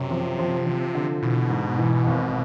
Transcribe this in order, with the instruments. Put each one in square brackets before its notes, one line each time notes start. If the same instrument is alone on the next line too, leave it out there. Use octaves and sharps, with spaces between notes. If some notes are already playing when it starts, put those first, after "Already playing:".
Already playing: [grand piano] F#2 [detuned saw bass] C3
[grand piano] F3
F3
F3
D3
[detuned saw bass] B2 [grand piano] E3
[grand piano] G#2
E3
G#1